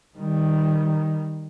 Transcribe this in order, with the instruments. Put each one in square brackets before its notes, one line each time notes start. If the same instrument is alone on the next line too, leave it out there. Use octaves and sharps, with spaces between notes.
[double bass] D#3 G3